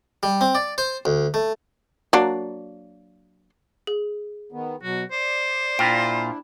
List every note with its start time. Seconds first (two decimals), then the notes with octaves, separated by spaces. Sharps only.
0.23 G3
0.41 C4
0.55 D5
0.78 C5
1.05 D2
1.34 A3
2.13 F#3 A#3 D4
3.87 G#4
4.52 D#3 B3
4.82 B2 F#3 F#4
5.11 C5 D5
5.79 A#2 D4 E4 F4 G5